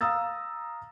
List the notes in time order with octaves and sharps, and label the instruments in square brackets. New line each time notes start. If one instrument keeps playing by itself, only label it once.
[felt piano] F5 A#5 D#6 E6 A6